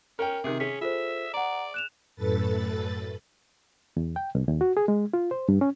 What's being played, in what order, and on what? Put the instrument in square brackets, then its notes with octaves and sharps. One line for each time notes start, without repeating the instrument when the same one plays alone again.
[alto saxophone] C#4 [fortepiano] A#4 G5
[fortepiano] C3 D#3 [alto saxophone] G#4
[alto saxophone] C#4 [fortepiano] G#4 [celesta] B6
[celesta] F4 A4 C5 [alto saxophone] E5
[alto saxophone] D5 [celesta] F#5 A#5
[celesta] F#6 E7 F7
[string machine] F#2 A2 A4 B4 A6
[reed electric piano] E2
G5
C2
D#2
F#4
G#4
G#3
F4
C5
G2
C#4